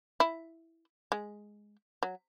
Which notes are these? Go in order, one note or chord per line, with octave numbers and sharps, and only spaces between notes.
E4
G#3
F#3